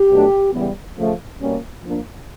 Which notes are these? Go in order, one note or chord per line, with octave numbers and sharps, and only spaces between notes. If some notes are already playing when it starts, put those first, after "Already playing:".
Already playing: G4
B2 F#3 A3 D4
C#3 E3 G3 B3
C#3 F3 A3
B2 G3 A#3 C#4
F3 A#3 D4